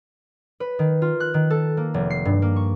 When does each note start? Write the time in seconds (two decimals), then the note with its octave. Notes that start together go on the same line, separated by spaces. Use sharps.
0.60 B4
0.79 D#3
1.02 F4
1.20 F#6
1.34 D#3
1.50 A4
1.77 A#3
1.94 F1
2.10 C7
2.25 G2
2.42 A#3
2.56 C#6